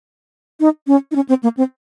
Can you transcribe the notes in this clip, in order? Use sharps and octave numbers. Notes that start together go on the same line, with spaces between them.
D#4
C#4
D#4
C#4
C4
A#3
C4